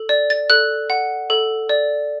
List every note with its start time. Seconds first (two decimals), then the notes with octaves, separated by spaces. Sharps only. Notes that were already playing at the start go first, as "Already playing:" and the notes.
Already playing: A4
0.09 D5
0.30 A6
0.50 A4 F#6
0.90 F#5
1.30 A4
1.69 D5